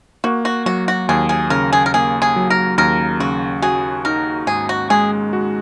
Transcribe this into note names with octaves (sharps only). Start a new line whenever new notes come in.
A#3 F#4
F#4
F#3 F#4
F#4
D#2 G#4
G#4
C#3 A#4
G#4
A#4
A#3 G#4
G#4
F#3
A#4
D#2 A#4
C#3 F#4
F#4 G#4
D#4 A#4
G#2 G#4
F#4
G#3 G#4
F#4